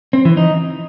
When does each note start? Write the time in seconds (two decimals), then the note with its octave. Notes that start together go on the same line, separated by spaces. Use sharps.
0.13 C4
0.25 E3
0.37 D#4